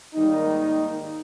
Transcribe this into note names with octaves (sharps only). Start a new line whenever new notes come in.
G#2 D#3 G3 A#3 D#4